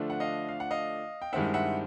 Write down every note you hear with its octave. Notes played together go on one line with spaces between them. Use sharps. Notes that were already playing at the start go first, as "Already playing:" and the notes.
Already playing: D3 F3 A3 D4
F#5
D#5 F5
F5
F#5
D#5 F5
G5
G2 D#3 G#3 C4 E4 E5 F#5
E5 F#5